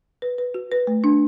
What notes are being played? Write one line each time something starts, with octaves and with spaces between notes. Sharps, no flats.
B4
B4
F#4
B4
A3
D4